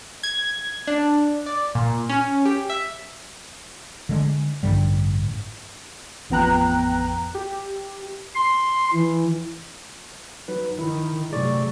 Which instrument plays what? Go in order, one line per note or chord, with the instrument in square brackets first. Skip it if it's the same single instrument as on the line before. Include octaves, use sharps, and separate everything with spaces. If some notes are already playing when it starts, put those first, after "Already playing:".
[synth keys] G#6
D4
D5
A#2
C#4
G4
E5
[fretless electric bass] D3 G#3
A1 G2 D3 G3
[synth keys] A1 F2 B3 G5 A#5 F#6
G4
[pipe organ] C6
E3
[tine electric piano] F#3 D#4 B4
[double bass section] D#3 [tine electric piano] E4
[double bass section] A2 C3 F#3 [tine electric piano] G#4 D5 C#6